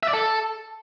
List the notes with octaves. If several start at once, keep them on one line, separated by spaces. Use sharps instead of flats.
E5
D5
A4